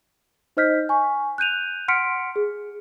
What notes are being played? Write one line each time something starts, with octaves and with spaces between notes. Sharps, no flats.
D#4 C5 D#5 F6 G6 B6
G#5 C#6
F#6 G6 D#7 F7
F#5 C6 F6 B6 C#7 D7
G#4